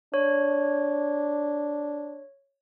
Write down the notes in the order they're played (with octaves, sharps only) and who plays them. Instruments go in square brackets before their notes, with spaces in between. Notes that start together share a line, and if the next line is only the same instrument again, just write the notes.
[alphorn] D4 [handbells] C#5